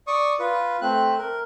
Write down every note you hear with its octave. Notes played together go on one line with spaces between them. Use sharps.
D5 C#6 D#6
F4 B4
A3 C4 F#6
A#4